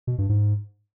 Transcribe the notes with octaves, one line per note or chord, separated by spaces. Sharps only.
B2
G2
G#2